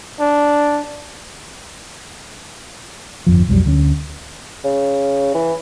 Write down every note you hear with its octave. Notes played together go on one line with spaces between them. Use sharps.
D4
G1 F2 F3
B1 F2 F#3 G3
D2 D3 E3 C#4
C#3
E3